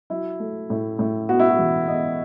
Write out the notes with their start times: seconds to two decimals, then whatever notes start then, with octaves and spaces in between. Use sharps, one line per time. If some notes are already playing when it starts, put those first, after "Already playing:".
0.10 F#3 E4
0.40 A3
0.70 A2
0.99 A2
1.29 B3 F#4
1.39 E4
1.49 F#4
1.59 E3
1.88 B3 D#5